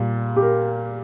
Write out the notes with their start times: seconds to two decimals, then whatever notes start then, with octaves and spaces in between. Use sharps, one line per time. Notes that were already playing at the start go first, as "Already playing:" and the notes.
Already playing: A#2 G3
0.36 G4
0.42 A#4